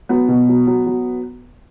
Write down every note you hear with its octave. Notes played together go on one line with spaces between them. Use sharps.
F#3 B3
B2
F#3
F#3
F#3